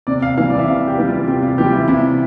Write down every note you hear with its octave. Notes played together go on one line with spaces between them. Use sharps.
C3 D5
F5
E3 G3 F5
D5
E5
C3 F5
G4
E3 G3
F4
C3 G4
F4
E3 G3 G4
E4
C3 E4